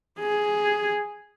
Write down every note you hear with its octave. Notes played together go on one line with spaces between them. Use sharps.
G#4